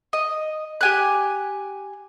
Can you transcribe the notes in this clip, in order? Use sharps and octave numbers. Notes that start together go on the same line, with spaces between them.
D#5
G4 G#5 F#6